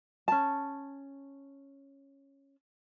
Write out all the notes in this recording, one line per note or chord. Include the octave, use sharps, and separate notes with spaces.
C#4 A5